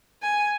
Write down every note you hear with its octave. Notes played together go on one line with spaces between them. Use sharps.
G#5